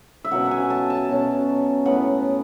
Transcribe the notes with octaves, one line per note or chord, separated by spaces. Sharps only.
E5
B2 F#3 C#4 F#5
F#5
G#5
A5
A5
B2 F#3 C#4
A2 F#3 B3 F#5